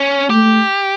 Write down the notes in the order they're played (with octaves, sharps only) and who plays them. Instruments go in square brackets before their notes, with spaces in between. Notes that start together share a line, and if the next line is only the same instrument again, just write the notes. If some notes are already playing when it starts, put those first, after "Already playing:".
Already playing: [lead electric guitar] C#4
[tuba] A3 [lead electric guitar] G4